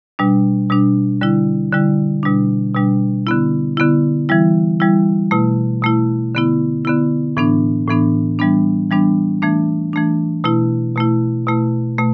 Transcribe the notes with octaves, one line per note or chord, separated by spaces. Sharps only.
B2 G3 D4
B2 G3 D4
D3 G3 E4
D3 G3 E4
B2 G3 D4
B2 G3 D4
D3 B3 E4
D3 B3 E4
E3 G3 E4
E3 G3 E4
B2 A3 E4
B2 A3 E4
D3 B3 E4
D3 B3 E4
A2 E3 B3 D4
A2 E3 B3 D4
E3 G3 B3 D4
E3 G3 B3 D4
E3 A3 D4
E3 A3 D4
B2 A3 E4
B2 A3 E4
B2 A3 E4
B2 A3